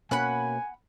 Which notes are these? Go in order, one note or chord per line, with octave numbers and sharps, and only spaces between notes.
B2 A#3 C#4 F#5 G#5 B5 F#6